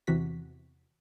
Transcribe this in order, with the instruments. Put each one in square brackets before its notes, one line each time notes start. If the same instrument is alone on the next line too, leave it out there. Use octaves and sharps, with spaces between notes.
[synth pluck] E2 C3 E3 F#4 B6